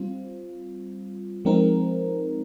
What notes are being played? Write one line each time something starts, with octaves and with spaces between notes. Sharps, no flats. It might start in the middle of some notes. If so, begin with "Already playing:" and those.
Already playing: G3 C4 F4
F3 G#3 C4 D#4 A#4